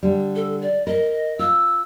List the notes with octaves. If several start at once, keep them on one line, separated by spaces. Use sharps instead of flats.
D3 G3
A4
D5
A#4 D#5
F4 E6